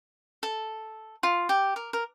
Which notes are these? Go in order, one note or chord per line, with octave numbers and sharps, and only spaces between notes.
A4
F4
G4
A#4
A#4